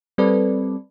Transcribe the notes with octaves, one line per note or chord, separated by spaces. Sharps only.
G3 C4 A4 B4 D5